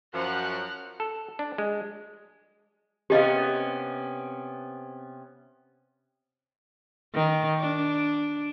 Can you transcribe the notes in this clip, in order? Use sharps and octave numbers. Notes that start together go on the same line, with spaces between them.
F#2 F3 F#5 F6 F#6
A4
D4
G#3
C3 B3 C#4 G4 D#5 F5
D#3
D4